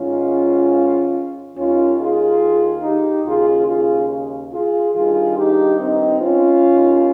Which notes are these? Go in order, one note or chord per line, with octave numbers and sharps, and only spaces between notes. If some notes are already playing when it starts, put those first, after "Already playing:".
Already playing: G#2 D#3 C#4 F4
D#2 D#3 C#4 F4
F4 G#4
D#4 G4
D#2 C#3 F4 G#4
F4 G#4
F4 G#4
G2 D#3 F4 G#4
D#4 G4
C4 D#4
C#4 F4
D#2 D#3